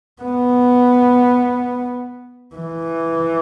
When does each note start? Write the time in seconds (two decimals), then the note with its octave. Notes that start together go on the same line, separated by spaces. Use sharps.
0.22 B3
2.55 E3